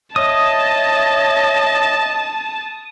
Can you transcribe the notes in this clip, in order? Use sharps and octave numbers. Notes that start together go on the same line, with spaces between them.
C#5 D#5 E5 A5 D#6